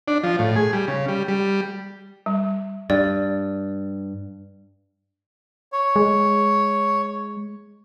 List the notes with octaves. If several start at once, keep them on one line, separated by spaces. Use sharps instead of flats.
D4
F3
A2
G#4
G3
C#3
G3
G3
G3
G2 D5
C#5
G#3